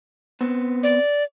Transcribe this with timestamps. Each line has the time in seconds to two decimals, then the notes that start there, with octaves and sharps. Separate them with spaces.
0.41 B3 C4
0.83 D5